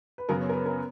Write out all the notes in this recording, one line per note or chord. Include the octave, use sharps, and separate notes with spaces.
B4
F#2 C#3 F#3 B3 A#4
C#5
A#4
B4
A#4